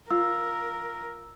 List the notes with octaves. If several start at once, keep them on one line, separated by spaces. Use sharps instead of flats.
F4 A#4 E6